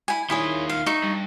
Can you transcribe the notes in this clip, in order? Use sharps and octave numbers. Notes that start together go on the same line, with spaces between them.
E4 G#5
D#3 E4 F4 G#4 C#5
F5
D#4 E5 C#6
G2